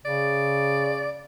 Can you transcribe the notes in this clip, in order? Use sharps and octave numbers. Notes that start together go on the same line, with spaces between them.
C#3 D5